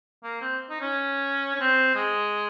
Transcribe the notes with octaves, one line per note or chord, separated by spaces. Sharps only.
A#3
C4
D#4
C#4
C#4
C4
G#3